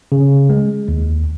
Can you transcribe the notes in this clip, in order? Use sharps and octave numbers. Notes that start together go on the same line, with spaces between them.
C#3
G#3
D#2